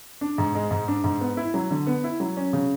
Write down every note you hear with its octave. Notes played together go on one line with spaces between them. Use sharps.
D4
G#2
G#3
G#2
D4
G#2
B3
E4
F#3
D3
B3
E4
F#3
C#4
C#3